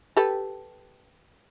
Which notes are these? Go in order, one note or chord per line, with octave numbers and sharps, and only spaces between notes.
G4 A4 B4